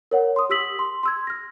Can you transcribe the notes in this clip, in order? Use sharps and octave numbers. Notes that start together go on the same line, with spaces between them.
A#4 C#5 F#5
C6 D#6
G4 D#6 E6 B6 F#7
C6
C6 E6 G#6
F6 A#6